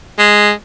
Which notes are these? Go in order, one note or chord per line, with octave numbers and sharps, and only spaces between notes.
G#3